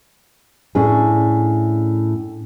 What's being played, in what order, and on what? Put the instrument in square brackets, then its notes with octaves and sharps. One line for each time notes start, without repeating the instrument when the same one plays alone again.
[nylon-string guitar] A2 C#4 D4 G#4